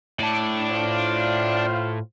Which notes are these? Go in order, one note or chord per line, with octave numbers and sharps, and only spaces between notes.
A2 D5 A5
F4 C5 F5